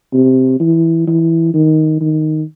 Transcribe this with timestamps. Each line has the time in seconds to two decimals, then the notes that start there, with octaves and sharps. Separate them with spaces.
0.14 C3
0.60 E3
1.08 E3
1.54 D#3
2.01 D#3